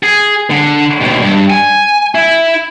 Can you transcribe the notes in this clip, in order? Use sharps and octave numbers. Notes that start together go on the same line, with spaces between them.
G#4
D3
D#2 B2
G2
G#5
E4